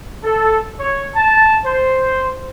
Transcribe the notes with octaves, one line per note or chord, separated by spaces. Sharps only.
A4
C#5
A5
C5